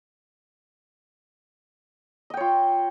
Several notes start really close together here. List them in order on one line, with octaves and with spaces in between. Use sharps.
D#5 G5 C#5 F4